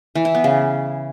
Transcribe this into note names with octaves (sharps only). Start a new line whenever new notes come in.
E3
E4
B3
C#3